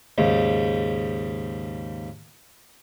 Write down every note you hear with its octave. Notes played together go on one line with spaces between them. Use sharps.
D#2 G#2 C#3